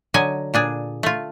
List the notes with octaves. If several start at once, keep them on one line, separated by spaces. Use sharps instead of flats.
D3 F#3 D#5 G#5
A#2 D4 G#4
A3 F4